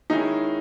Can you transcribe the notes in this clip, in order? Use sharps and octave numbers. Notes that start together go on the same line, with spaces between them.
D#3 G#3 C#4 D#4 E4 G#4